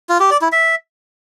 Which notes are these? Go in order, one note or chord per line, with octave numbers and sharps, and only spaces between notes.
F4
G4
D5
E4
E5